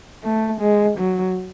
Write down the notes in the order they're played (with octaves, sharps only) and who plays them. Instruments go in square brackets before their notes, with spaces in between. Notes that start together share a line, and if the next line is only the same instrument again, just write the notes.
[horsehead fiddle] A3
G#3
F#3